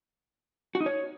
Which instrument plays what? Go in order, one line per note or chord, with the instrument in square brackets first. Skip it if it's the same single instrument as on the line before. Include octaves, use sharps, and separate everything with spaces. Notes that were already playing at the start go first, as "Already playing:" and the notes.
[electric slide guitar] F#4
D#4
C#5